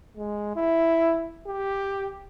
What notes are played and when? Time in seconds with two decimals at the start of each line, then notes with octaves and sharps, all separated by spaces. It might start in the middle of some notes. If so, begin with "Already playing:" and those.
0.17 G#3
0.56 E4
1.47 G4